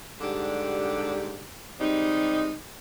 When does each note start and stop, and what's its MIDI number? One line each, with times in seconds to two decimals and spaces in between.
0.20 1.47 44
0.20 1.47 50
0.20 1.47 55
0.20 1.47 62
0.20 1.47 67
1.80 2.53 48
1.80 2.53 55
1.80 2.53 56
1.80 2.53 63